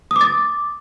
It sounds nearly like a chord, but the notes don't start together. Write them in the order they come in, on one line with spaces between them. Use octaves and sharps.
D#6 D6 A6